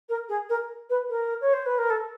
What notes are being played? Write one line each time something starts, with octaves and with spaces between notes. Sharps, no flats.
A#4
G#4
A#4
B4
A#4
C#5
C5
B4
A#4
A4